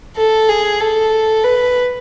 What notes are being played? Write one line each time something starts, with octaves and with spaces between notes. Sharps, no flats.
A4
G#4
A4
B4